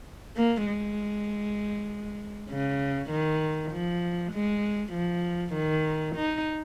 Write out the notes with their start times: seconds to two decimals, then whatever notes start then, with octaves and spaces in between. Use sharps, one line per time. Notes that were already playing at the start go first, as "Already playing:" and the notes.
0.37 A#3
0.67 G#3
2.50 C#3
3.11 D#3
3.72 F3
4.33 G#3
4.93 F3
5.54 D#3
6.16 D#4